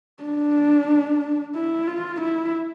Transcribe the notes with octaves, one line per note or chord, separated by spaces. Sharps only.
D4
E4
F4
E4